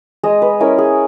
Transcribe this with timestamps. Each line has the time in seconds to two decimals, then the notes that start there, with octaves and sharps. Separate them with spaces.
0.23 G#3 D#5
0.42 B4
0.60 C#4 E4 A#4
0.78 G#4